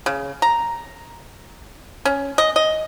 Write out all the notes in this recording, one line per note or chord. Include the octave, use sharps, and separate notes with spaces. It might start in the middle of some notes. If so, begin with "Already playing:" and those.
C#3
A#5
C#4
D#5
D#5